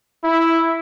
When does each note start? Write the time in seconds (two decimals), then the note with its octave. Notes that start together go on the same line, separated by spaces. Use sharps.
0.24 E4